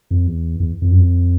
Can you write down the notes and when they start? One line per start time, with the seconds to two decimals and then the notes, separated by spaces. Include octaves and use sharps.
0.11 F2
0.27 E2
0.60 E2
0.82 F2
0.91 F#2
0.99 F2